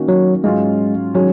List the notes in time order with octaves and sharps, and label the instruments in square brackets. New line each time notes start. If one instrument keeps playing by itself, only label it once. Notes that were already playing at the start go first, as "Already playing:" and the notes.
Already playing: [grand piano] D#3 A#3 C#4 F#4
[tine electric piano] F#3
[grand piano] G#2 F#3 C#4 F4 [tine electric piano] G#3
[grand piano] D#3 G#3 C#4 [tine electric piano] F#3